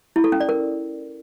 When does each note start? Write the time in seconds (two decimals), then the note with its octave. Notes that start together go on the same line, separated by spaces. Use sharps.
0.16 E4
0.24 A4
0.32 C#4
0.40 D5
0.49 A#4